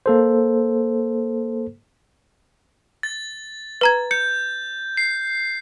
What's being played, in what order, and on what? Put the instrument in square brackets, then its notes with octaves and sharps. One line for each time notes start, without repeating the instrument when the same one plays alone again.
[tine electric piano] A#3 A4 C5
[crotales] A6
[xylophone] B4 A#5 G#6
[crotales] G6 [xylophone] C#7
[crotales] C7